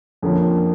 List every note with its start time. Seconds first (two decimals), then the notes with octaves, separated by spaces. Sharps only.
0.22 F2 D3 F3 A#3 C#4